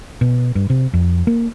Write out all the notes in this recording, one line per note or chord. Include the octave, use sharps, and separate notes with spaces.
B2
G2
C3
F2
A#3